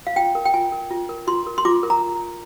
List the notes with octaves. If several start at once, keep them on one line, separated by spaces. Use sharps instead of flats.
F5
F4 G5
A#4
G5
F4 G#5
A#4
F4
A#4
F4 C6
A#4
C6
F4 D6
A#4
A#5